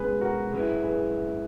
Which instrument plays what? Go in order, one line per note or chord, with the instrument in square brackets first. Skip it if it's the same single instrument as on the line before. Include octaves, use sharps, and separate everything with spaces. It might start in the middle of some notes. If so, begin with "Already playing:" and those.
Already playing: [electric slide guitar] B2 G#3 C#4 [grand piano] G#4 B4
[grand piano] F#4 A#4
[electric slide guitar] G#2 F#3 C#4 E4 [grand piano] G#4 B4
[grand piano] G#4 B4